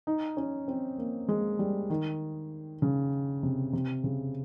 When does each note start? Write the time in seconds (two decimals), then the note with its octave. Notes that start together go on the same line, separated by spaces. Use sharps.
0.07 D#4
0.37 C#4
0.68 C4
0.98 A#3
1.29 G#3
1.59 G3
1.90 D#3
2.82 C#3
3.43 C3
3.73 C3
4.04 C#3